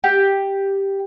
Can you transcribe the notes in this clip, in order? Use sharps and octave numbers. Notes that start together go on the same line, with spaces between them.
G4